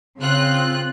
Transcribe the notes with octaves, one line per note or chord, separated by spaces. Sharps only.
C#3 C4 F4 F#6